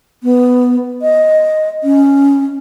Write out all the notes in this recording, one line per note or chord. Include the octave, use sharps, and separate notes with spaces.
B3
D#5
C#4